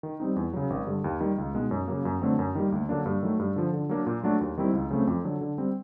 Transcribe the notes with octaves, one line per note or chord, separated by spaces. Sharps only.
D#3
G3 C4 D#4
E2
C#3 F#3
G#1
G2 D3
D#2
D#3 G3
C#2
B2 G#3 B3 D#4
F#2
C#3 F#3 A#3
F#2
D3 F#3 A3 C4
F#2
D#3 G3 A#3
D2
D3 F#3 A#3 D4
G2
D#3 F#3 A3
G2
D3 F3
D3
F#3 A#3 D4
A#2
F#3 A3 D4 F#4
D#2
D#3 G3 C4 E4
C#2
C#3 F#3 A3 C4
F2
D3 F#3
D3
G3 C4